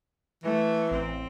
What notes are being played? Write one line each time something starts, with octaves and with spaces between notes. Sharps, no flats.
E3 A3
A1 C4